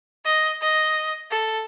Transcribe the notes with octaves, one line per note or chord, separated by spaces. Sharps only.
D#5
D#5
A4